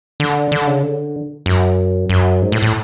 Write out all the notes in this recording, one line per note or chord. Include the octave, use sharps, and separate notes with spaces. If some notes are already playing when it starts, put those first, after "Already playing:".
D3
D3
C#3
D3
F#2
F#2
G#2
A2
A2